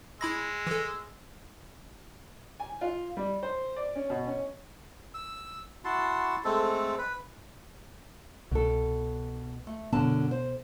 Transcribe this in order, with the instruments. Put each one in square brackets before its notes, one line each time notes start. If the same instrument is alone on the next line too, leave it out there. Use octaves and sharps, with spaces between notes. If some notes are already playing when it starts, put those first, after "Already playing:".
[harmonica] G#3 E6 [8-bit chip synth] E4 B5 A#6
[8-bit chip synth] E3 A4
[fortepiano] G#5
F4
G3
C5
D5
C#4
B2
C#4
[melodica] E6
E4 F#4 A5 C6
G#3 A3 C4 A4
B4
[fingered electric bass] C2 [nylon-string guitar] B2 A4
[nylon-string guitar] A3
[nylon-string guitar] F#2 D3 A5 [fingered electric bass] B2 B3
[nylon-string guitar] C5